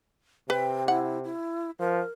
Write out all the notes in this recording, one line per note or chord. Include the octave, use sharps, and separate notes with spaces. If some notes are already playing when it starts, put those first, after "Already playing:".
C3 B4 G5
E4 F#5
E4
F3 A#4